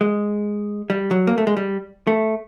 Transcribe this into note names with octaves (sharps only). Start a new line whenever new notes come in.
G#3
G3
F#3
A#3
A3
G#3
G3
A3